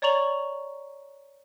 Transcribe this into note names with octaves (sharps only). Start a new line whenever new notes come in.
C#5 D5 A#5 C#6 F7 F#7